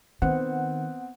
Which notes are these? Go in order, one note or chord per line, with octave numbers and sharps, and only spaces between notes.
D#3 B3 C4 F#5